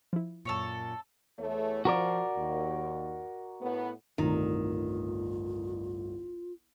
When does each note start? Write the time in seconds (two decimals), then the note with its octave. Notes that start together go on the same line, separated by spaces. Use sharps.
0.13 F3 E4
0.45 F#2 A#2 A4 C#5 C#6
1.39 E2 A3 C#5
1.85 F3 F#4 A#4 D5
2.38 D#2
3.62 A2 B3
4.18 G1 C2 A2 D#3 F4